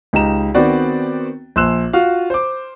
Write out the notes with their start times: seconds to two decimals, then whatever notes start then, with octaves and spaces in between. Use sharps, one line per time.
0.13 C#2 D#4 G4 A#5 E7
0.55 D#3 B3 C4 F#4 D5
1.56 A#1 C6 E6 F#6 E7
1.93 F4 F#4 F5
2.30 C5 D6